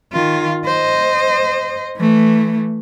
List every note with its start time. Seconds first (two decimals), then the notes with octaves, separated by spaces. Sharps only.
0.13 D#3 F4
0.66 C5 D#5
1.97 E3 A3